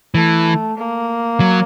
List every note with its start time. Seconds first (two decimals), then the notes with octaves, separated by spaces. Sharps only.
0.15 E3 A3
0.77 A#3
1.40 F#3